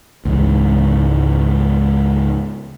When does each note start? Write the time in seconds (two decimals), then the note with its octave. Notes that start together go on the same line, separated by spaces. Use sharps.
0.25 C#2 G#2 E3